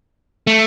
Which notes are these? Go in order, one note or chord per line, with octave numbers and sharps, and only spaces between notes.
A3